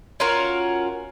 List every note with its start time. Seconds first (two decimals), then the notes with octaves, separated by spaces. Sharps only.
0.20 C#4 F4 F#4 A#4